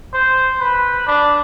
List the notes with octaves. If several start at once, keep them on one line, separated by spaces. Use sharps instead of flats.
C5
B4
D4